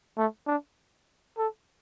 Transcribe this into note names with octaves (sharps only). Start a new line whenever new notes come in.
A3
D4
A4